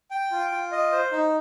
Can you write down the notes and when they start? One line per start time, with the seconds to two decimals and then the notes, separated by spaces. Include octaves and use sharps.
0.11 G5
0.31 F4
0.52 F4
0.72 D#5
0.92 C5
1.12 D#4